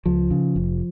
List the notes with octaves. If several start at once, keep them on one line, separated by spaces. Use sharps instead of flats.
C#2 F3
C#3
F1